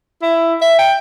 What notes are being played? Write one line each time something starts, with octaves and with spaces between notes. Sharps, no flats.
E4
E5
G5